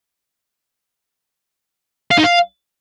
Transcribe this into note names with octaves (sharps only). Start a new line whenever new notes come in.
F5
D#4
F5